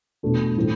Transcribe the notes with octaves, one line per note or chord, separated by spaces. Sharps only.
E2 B2 A3 D4
A2 E3 A3 C4